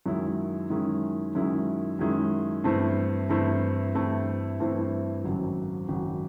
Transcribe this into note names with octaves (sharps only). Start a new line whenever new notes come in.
F#2 D#3 G#3 C#4 E4
F#2 D#3 G#3 C#4 E4
F#2 D#3 G#3 C#4 E4
F#2 D#3 G#3 C#4 E4
G2 E3 A3 C4 E4
G2 E3 A3 C4 E4
G2 E3 A3 C4 E4
G2 E3 A3 C4 E4
G#1 F#2 C#3 F#3
G#1 F#2 C#3 F#3